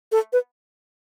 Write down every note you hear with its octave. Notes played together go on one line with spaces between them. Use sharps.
A4
B4